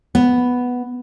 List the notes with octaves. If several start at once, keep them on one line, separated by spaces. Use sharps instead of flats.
B3